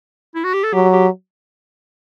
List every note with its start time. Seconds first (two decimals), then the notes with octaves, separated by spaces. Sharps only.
0.35 E4
0.44 F#4
0.54 G4
0.64 A4
0.73 F#3 G4
0.93 G4